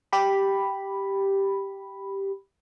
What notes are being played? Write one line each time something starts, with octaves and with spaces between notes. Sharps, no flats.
G4 B5